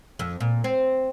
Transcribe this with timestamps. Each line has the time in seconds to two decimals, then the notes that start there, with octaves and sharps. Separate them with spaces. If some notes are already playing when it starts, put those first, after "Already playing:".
0.19 F2
0.40 A#2
0.64 C4